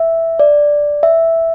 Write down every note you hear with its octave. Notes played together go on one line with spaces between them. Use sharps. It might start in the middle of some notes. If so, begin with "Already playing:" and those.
Already playing: E5
D5
E5